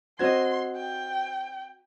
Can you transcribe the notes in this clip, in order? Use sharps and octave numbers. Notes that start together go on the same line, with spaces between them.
C4 F#4 C5 D#5 C6 G#6
G5